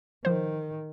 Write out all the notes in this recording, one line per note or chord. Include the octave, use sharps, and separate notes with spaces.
D#3 F3 C5